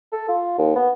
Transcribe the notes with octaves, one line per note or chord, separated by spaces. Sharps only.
A4
F4
D#2
B3